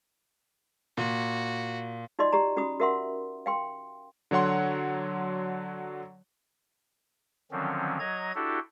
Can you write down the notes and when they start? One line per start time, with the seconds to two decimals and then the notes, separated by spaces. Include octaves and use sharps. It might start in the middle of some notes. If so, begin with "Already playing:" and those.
0.97 A#2 F#4
2.19 D#4 F4 F#4 D5 D#5 C6
2.32 G4 D5 A#5
2.57 C#4 F#4 B5 D#6
2.80 F#4 A#4 E5 F#5 C6
3.46 F5 G5 C6
4.31 D3 F#3 C#5 F#5 C6
7.51 D3 D#3 F3 F#3 C4 C#4
8.00 F#3 D#5 A#5 G#6
8.35 D4 E4 F#4 G4 A4